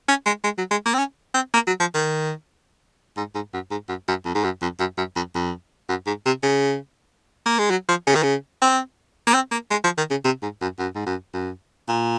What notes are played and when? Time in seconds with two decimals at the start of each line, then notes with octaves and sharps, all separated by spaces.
0.09 C#4
0.26 G#3
0.44 G#3
0.58 F#3
0.71 G#3
0.86 A#3
0.94 C4
0.98 C#4
1.35 C4
1.54 A#3
1.67 F#3
1.80 F3
1.95 D#3
3.17 G#2
3.35 G#2
3.54 F#2
3.71 G#2
3.89 F#2
4.08 F#2
4.25 F2
4.35 G#2
4.44 F#2
4.62 F2
4.80 F#2
4.98 F#2
5.16 F2
5.35 F2
5.89 F#2
6.07 G#2
6.26 C3
6.43 C#3
7.46 A#3
7.59 G#3
7.71 F#3
7.89 F3
8.07 C#3
8.15 D#3
8.23 C#3
8.62 C4
9.27 A#3
9.34 C4
9.52 A#3
9.71 G#3
9.84 F3
9.98 D#3
10.11 C#3
10.25 C3
10.42 G#2
10.62 F#2
10.79 F#2
10.95 G#2
11.07 F#2
11.34 F#2
11.89 A#2